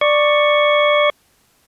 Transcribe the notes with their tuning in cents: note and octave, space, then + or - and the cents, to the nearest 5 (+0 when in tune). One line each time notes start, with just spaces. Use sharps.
D5 +10 C#6 +0